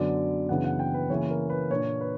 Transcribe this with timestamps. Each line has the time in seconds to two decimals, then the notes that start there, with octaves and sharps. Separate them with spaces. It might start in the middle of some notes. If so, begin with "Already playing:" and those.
Already playing: F#2 D3 F#3 B3 D5
0.49 F#2 C#3 E3 B3 D4 F#5
0.64 F#5
0.79 G5
0.94 B4
1.10 C#3 E3 A#3 C#5
1.30 A#4
1.50 B4
1.70 A#2 A#3 D4 C#5
2.01 B4